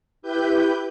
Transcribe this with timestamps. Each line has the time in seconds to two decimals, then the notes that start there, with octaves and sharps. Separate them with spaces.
0.22 E4 G4 B4 G6